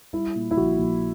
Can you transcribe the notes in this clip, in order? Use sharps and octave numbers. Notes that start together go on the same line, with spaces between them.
G3 E4
A#2
E4
A#1 F#4
A#1